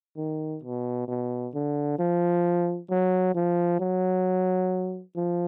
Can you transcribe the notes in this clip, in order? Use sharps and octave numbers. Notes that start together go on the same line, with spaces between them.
D#3
B2
B2
D3
F3
F#3
F3
F#3
F3